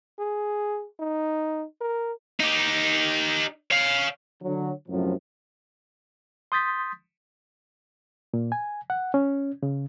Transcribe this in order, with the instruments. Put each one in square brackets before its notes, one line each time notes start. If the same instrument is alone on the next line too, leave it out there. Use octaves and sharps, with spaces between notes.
[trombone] G#4
D#4
A#4
[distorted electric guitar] D#4 G4
C#5 F5
[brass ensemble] D3 F#3
F#2 A2 C3 F3 F#3
[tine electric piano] C6 D#6 G6 A6 B6
[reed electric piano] A#2
G#5
F#5
C#4
C#3